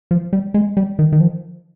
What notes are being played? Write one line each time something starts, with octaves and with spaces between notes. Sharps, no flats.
F3
G3
G#3
G3
D#3
D#3
F3